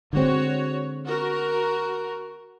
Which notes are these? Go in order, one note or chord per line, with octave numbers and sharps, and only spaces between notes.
D3 G#3 C4 F#4 C#5
F#4 A#4